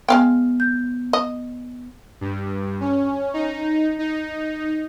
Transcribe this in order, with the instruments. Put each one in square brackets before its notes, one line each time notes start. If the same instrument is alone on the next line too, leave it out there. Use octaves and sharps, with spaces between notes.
[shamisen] G#3 F5 G5 [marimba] B3 F6
[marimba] G6
[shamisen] D#5
[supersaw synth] G2
C#4
D#4
D#4